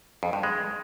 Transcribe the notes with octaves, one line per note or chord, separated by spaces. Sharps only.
F2
G2
G#3